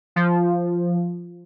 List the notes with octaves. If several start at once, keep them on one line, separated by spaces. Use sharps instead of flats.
F3